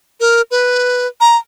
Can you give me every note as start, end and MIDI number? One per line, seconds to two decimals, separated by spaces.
0.20 0.41 70
0.51 1.07 71
1.21 1.36 82